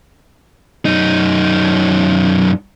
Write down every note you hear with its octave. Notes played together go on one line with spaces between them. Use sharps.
F#2 D#4